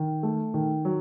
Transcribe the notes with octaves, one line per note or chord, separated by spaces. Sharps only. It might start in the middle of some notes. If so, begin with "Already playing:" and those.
Already playing: D#3
A3
D#3
F#3